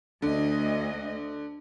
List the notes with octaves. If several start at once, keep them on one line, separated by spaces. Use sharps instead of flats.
D2 D3 D#5